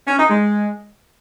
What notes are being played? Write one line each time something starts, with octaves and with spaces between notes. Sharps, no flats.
C#4
D#4
G#3